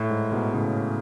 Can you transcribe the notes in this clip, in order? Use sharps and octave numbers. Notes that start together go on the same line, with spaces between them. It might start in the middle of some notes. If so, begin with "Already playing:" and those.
Already playing: A2
G#2
G#2 B2
A2 C#3